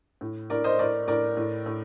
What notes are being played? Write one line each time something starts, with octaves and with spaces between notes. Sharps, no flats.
A2
A2 A#4 D5
C5 D#5
A2 A#4 D5
A2 A#4 D5
A2
A2